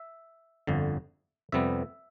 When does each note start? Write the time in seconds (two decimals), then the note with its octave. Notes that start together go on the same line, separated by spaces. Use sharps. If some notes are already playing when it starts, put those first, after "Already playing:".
Already playing: E5
0.67 G1 F2 D3
1.52 F2 C3 G3 B3 E5